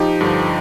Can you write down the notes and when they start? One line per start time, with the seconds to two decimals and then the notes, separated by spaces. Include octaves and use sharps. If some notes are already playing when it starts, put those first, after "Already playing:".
Already playing: F3 D#4 G4
0.21 G2 D3 F3